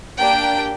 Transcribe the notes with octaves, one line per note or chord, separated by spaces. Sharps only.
A#3 D4 G4 G5